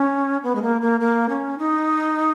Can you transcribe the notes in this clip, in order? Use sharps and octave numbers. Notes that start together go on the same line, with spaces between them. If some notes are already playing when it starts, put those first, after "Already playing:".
Already playing: C#4
B3
G#3
A#3
A#3
A#3
C#4
D#4